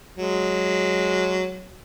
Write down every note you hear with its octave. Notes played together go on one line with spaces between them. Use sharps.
F#3 G#3